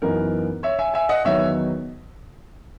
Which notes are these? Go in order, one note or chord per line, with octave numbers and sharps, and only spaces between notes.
F#2 E3 B3 D#4 A#4
C#5 E5
E5 G#5
E5 G#5
D#5 F#5
E2 D#3 F#3 B3 D#4 C#5 E5